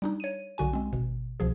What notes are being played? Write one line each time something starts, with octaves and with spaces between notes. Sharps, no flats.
G3 D4 D#4
C#5 D#7
B1 D3 F#4 G#5
G#3 C4
G#1 B2
C2 B2 F3 G#4